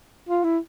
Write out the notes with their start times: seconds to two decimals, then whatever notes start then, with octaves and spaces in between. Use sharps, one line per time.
0.29 F4
0.44 E4